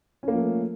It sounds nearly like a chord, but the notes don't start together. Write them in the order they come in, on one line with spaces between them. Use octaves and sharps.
C#4 A#3 F3 A3